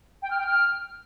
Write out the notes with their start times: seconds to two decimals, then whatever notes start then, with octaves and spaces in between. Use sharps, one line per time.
0.22 G5
0.30 F6
0.38 G5
0.47 F6